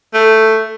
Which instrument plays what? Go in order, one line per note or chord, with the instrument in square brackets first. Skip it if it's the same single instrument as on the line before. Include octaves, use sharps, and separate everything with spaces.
[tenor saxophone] A3